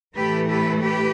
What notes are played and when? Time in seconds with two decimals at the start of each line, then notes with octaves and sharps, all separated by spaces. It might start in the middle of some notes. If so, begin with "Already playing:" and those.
0.16 A2 E3 A3 G4 B4
0.49 G4 B4
0.81 G4 B4